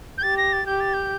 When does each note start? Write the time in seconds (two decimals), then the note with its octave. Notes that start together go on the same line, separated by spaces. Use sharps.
0.18 G6
0.23 G4 A6
0.37 A#6
0.53 A6
0.66 G4 G6
0.80 A6
0.94 G6